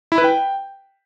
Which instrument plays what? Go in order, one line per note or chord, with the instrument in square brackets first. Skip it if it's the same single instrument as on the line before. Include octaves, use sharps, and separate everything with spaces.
[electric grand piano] E4
B4
G5